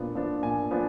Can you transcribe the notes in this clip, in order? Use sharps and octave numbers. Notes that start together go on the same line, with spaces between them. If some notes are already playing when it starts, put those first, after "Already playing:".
Already playing: A#2 F3 B3 D4
F3 B3 D4
A#2 G#5
F3 B3 D4